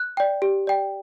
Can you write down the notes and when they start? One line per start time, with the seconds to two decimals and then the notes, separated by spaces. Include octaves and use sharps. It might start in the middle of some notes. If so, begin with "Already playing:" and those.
Already playing: F#6
0.17 D5 G5
0.42 G4
0.67 D5 G5